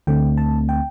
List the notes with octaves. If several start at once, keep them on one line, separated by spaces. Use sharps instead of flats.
D2 D3 A3 C4 G5
A5
G5